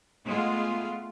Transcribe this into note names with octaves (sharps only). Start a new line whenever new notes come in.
G#3 A3 B3 F4